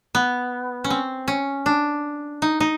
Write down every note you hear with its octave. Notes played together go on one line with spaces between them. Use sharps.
B3
C#4
C4
C#4
D4
D#4
D#4